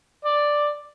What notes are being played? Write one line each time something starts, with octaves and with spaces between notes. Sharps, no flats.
D5